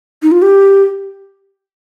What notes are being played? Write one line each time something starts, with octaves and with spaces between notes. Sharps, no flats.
D#4
F4
G4